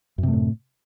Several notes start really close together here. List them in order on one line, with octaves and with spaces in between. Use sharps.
F#2 C3 A3 A2